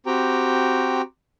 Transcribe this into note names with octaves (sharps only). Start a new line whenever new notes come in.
C4 F#4 G4 G5 A#5